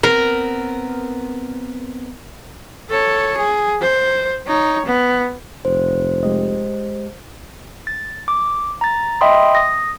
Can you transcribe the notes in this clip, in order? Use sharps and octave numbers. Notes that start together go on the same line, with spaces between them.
B3 C4 A#4
A4 C#5
G#4
C5
D#4 C#5
B3
F1 C5
G#3 G4 D#5
A6
D6
A#5 A6
D#5 E5 G5 B5 C6 D#6
D#6 A#6